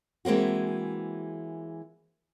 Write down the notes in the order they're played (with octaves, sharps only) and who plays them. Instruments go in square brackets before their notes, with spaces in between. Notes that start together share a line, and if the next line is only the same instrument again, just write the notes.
[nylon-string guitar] E3 G#3 A#3 C4 F#4